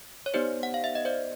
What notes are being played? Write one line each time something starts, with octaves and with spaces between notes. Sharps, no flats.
C#5
B3 D#4 G4 C5 D5
F#5
F5
E5
D#5
C5 D5